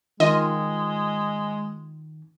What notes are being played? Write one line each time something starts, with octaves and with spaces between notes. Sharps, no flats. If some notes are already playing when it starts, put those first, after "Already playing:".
D#3 G#3 F4 D#5